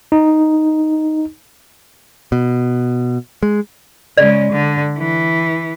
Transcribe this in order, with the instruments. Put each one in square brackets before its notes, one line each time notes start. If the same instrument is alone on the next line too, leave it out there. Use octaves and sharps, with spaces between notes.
[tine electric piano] D#4
[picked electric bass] B2
G#3
[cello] C#3 G#3 [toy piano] D5
[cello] D3
E3